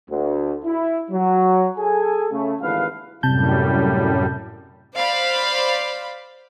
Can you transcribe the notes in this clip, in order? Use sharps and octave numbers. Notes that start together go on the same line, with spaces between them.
D2
E4
F#3
G#4 A4 G#5
C#3 A3
G#1 D#2 D3 E3 B4 F5
F#2 A2 C3 G3 A5 G6
C5 D5 F5 B5